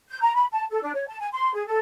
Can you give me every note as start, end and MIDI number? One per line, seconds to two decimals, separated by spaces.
0.10 0.20 91
0.21 0.34 82
0.34 0.45 83
0.51 0.64 81
0.69 0.80 69
0.82 0.92 62
0.94 1.05 73
1.07 1.16 81
1.19 1.27 80
1.32 1.51 84
1.53 1.64 68
1.66 1.79 69